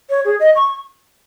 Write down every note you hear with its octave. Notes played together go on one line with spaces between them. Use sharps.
C#5
G#4
D#5
C#6